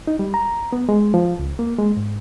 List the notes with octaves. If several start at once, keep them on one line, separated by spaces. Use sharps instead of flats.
D#4
G3
A#5
B3
G#3
F3
C#2
A#3
G#3
G#2